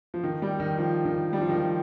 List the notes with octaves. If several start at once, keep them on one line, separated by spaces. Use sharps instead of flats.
F3
D#3
G3
D#3
F3
D#3
G3
F3
D#3
F3